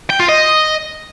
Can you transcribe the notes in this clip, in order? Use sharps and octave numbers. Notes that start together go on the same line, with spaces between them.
G5
F4
D#5